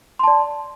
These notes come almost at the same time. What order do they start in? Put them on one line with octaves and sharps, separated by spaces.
C6 A5 D5